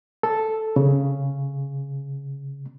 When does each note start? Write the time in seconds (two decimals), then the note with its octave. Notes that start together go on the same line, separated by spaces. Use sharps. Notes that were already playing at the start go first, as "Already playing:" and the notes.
0.23 A4
0.76 C#3